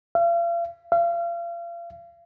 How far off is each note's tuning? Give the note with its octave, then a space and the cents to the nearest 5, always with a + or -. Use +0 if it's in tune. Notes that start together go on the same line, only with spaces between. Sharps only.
F5 -40
F5 -35